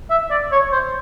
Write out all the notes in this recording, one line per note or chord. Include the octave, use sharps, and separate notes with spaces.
E5
D5
C#5
C5